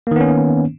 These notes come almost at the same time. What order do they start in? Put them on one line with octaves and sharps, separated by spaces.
A#3 D#3 B3 C#4